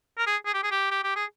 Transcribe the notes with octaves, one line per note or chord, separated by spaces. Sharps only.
A#4
G#4
G#4
G4
G#4
G4
G4
G4
G#4